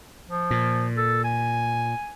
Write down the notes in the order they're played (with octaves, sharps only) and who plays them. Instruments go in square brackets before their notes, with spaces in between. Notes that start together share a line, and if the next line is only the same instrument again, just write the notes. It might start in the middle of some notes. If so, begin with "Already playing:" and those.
[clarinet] F3
[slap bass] A#2
[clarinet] A4
G#5